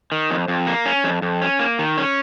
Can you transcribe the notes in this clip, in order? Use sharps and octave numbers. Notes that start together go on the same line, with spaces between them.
D#3
F2
F2
A#3
C#4
F2
F2
C#4
A#3
D#3
C#4